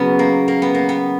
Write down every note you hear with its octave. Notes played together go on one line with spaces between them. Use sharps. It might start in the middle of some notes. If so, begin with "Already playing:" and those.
Already playing: C#3 F#3 B3
A#3
A#3
B3
A#3
B3